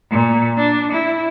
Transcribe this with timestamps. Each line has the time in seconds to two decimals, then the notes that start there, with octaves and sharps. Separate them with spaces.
0.10 A#2
0.57 D4
0.92 E4